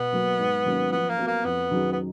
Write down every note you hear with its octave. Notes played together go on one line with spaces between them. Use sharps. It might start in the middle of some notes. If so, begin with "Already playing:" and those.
Already playing: B2 B3
F#3 A#3
G#2
D#3 F#3 A#3 C#4
F3 B3
A#3
B3 F#4 A#4
A#3
F2 B3
D#3 F#3 C#4 G#4
B3